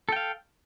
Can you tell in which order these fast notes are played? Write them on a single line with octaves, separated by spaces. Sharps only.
A4 G5 F5